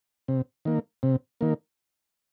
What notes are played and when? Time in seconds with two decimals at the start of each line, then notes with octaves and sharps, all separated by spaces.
0.28 C3
0.65 D#3 A#3
1.03 C3
1.41 D#3 A#3